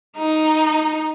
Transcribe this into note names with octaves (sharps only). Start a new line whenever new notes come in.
D#4